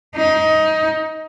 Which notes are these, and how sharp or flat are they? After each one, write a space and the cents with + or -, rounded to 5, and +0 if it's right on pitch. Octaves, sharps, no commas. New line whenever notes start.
D#4 +20